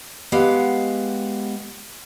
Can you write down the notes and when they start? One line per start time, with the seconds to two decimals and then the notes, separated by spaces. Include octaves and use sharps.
0.32 G#3 B3 G4 F5 F#5